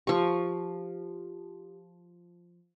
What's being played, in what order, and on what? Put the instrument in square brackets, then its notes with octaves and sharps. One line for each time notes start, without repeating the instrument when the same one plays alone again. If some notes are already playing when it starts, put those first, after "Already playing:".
[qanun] F3 C#6 [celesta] G4